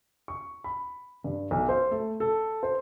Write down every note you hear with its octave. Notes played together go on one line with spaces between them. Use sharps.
C#6
B5
G2
B1
C5
A3
A4
C5